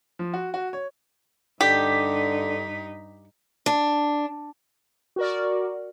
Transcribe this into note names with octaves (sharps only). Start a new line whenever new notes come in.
F3
F#4
F#4
C#5
G2 D3 D#4 G4 B6
D4
F#4 A#4 D5